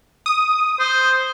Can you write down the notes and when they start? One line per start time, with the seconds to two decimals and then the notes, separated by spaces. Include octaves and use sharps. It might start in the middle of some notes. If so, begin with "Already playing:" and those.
0.26 D#6
0.80 C5